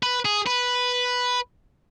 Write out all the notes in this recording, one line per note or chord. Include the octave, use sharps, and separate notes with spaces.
B4
G#4
B4